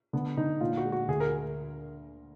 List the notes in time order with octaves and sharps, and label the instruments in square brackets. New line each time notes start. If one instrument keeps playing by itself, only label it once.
[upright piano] D3 [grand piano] B3
[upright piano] D3 [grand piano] D#4
[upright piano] A#2 [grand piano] F4
[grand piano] F#4
[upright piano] G#3
[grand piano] F#4
[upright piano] D2 [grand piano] G#4
[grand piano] A#4